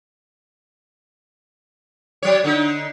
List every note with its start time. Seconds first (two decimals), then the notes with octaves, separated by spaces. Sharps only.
2.23 F#3 C#5
2.44 D3 D#4